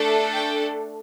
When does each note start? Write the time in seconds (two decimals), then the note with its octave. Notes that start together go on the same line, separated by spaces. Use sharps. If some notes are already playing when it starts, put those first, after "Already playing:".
Already playing: A3 D4 A4
0.33 G5